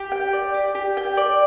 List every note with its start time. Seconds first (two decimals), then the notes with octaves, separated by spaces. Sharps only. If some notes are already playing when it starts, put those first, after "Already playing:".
Already playing: G4
0.12 G5
0.33 D5
0.54 G4
0.75 G4
0.97 G5
1.17 D5